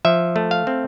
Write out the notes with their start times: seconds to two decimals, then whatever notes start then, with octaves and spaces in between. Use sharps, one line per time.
0.05 F3 E5
0.36 A3
0.51 F5
0.67 C4